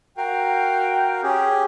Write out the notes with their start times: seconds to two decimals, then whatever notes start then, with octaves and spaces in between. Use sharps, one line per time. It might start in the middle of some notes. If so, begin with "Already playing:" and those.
0.17 F#4 A#4 F5 G5
1.23 C#4 G4 G#4